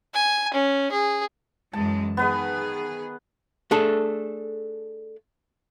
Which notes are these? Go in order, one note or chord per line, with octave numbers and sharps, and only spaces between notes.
G#5
C#4
G#4
F#2 E3 G#3 A5
D#3 B3 G#4 B4 D#5
A3 D4 G#4 A4